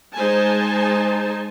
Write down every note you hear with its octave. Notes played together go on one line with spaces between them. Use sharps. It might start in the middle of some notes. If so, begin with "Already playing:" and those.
G#3 D#4 C5 G#5 A5